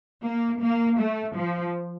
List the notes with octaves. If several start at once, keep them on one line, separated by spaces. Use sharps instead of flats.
A#3
A#3
A3
F3